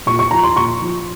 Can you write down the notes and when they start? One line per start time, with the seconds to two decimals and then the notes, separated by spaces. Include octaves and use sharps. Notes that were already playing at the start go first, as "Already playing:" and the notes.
0.06 A#2 C#6
0.19 C#6
0.31 F3 A#5
0.43 C6
0.56 A#2 C#6
0.82 F3